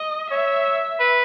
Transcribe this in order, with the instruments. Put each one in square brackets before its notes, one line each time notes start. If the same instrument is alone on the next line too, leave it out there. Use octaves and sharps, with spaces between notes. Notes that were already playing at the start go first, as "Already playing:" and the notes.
Already playing: [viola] D#5
[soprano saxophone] C#5 [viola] E5
[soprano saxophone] B4